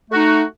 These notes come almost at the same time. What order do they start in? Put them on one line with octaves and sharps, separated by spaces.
A3 F#4 D#4